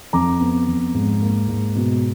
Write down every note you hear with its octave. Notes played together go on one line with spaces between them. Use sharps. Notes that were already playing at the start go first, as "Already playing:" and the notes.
F2 A#5 D6
B3
F2
G#2
A#3
G#2
B2